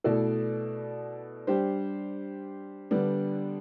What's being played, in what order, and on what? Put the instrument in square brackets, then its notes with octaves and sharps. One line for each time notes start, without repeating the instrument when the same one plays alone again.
[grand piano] B2 A3 E4 A4 D5
G3 D4 G4 C5
D3 G3 B3 D4